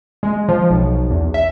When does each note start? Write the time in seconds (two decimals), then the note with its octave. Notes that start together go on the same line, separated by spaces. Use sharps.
0.23 G#3
0.49 F3
0.70 B1
1.10 E2
1.34 E5